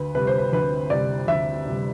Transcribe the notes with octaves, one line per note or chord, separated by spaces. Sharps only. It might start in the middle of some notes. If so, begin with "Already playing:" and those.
Already playing: D2 B4
C3 G3 B4
C5
B4
D2 B4
C3 G3 D5
D2 E5
C3 G3